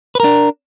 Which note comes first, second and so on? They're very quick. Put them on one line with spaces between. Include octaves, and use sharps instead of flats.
B4 A#4 D4